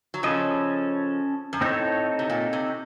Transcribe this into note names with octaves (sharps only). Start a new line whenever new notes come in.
F#3
C#3 F3 C#4 A4 D#5
F#2
A2 C4 D#4 A4 C#5
C3
A#2
C3